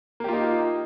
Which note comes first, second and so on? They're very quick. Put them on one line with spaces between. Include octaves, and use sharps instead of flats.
A#3 G4 F4 D#4